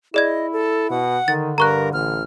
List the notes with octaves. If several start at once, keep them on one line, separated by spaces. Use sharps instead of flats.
E4 G#4 D5 D#5 G#6
A4
B2 F#5
D3 D#3 A6
G2 A#4 A#5 C#6 F#6
A1 F6